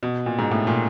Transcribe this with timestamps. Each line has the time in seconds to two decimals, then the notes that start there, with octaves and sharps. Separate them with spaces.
0.03 B2
0.26 A#2
0.39 G#2
0.51 A2
0.67 A#2